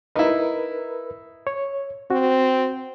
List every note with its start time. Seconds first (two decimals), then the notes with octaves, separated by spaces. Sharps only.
0.16 D#4 E4 A#4 B4
1.47 C#5
2.10 C4 F#4